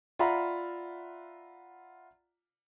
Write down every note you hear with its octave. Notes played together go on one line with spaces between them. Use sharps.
F4 D5 E5 F#5 A#5 B5